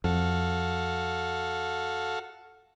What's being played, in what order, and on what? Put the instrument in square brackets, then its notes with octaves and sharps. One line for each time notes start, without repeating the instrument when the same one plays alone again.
[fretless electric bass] F2 [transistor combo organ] F#4 A4 F5